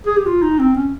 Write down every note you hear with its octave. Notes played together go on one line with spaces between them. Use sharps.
G#4
G4
F4
D#4
C4
C#4